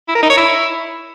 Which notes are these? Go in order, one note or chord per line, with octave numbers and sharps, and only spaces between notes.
E4
A#4
D#4
C#5
E4